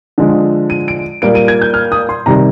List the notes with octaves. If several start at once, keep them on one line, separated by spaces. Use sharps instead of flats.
D3 F3 G#3
D#7
D7
A#2 G3 A#3 D7
D#7
G#6
G6
F6
D#6
C6
C3 D#3 G3 A#5